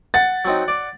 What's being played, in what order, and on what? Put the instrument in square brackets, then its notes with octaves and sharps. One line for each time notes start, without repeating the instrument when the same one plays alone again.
[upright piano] F#5 A6
[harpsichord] F#3 C4 D#4
D5